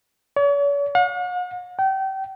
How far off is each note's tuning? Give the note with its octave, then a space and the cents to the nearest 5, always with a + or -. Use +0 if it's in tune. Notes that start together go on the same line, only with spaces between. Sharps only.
C#5 +45
F#5 -45
G5 -30